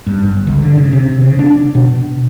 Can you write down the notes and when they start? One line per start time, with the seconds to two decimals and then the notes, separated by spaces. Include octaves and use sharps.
0.07 G2
0.23 G1
0.47 C#2
0.62 D3
0.78 C#3
0.92 C3
1.21 C#3
1.39 D4
1.75 B2